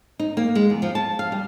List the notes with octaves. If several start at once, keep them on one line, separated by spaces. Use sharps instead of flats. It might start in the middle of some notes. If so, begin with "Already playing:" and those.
D#4
A#3
G#3
E2
F3
A5
F5
G3